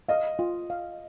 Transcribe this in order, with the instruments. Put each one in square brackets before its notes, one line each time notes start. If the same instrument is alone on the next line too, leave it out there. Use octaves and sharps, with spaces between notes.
[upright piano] D#5 [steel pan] F5
[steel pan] F4
F5